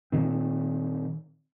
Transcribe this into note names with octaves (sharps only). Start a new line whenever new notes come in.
A#2 D#3 C4